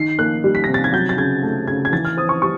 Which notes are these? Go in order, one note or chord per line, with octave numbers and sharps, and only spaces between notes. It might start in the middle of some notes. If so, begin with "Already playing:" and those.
Already playing: D#3 C7
A#3 F#6
G3
B6
C3 A#6
A6
G#6
F#3 G6
A6
C#3 G#6
A3
C#3 G#6
G#6
E3 A6
F6
C4 D#6
C#6
G3 C#6